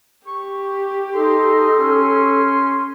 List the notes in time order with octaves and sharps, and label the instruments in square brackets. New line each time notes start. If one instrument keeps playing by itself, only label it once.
[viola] G4 [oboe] C#6
[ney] D#4 [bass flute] A4 [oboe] C6
[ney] C#4